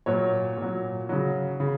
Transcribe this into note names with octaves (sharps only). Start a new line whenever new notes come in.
A#2 F#3 C#5
A#2 F#3
C#3 F#3
C#3